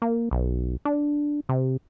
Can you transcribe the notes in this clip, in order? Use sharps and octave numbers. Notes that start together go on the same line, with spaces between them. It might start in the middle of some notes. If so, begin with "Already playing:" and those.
A#3
B1
D4
C3